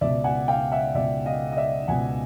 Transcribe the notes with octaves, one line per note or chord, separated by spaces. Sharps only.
C#2 B2 D5 E5
F#5 G#5
F5 G5
E5 F#5
C#2 B2 D5 E5
D#5 F5
D#5
D5 E5
C#2 B2 F#5 G#5